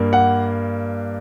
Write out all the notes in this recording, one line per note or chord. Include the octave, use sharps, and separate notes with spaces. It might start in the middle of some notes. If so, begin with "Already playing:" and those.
Already playing: G2 A#3
F#5